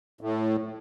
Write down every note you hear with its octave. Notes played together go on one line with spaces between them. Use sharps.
A2